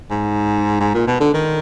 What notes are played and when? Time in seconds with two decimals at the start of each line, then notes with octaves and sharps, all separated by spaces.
0.11 G#2
0.80 G#2
0.94 A#2
1.07 B2
1.20 D3
1.34 D#3